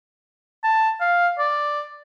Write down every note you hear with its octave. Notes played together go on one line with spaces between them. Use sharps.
A5
F5
D5